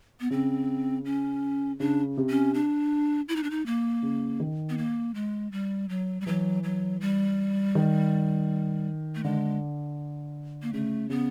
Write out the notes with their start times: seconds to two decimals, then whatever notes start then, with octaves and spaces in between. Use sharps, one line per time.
0.21 B3
0.30 C#3 C4
1.05 C#4
1.80 C#3 D4
2.17 C3
2.30 C#4
2.54 D4
3.29 E4
3.36 D#4
3.43 D4
3.51 D#4
3.66 A#3
4.03 C#3
4.40 D#3
4.70 B3
4.78 A#3
5.15 G#3
5.52 G3
5.89 F#3
6.21 G3
6.26 E3 F#3
6.64 F#3
7.01 G3
7.75 D#3
9.15 A3
9.24 D3 G#3
10.62 A#3
10.73 C#3 A3
11.10 C#3 B3